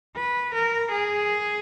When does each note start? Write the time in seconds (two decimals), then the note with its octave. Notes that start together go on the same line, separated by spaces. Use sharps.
0.16 B4
0.54 A#4
0.91 G#4